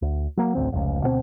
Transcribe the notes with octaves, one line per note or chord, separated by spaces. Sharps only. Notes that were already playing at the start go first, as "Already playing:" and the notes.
D2
F#3 A#3
A1 D2 C4
F1 C#2
D2 B2 A#3 C4